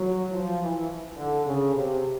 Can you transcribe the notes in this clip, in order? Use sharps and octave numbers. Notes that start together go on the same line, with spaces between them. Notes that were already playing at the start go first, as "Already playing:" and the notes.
Already playing: F#3
F3
E3
D3
C#3
C3